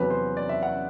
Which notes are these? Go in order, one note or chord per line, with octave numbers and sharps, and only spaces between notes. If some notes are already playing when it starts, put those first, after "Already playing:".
Already playing: E2 C3 F#3 B4
C5
D5
E5
F#5